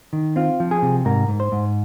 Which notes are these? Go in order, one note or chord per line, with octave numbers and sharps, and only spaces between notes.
D#3
C4 F4
F3
G#4
C3
G#2 A#4
G#2
C5
G#2